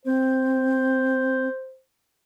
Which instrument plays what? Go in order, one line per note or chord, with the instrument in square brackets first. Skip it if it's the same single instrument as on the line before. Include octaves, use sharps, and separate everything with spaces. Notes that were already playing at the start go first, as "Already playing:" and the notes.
[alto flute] C4 [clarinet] C5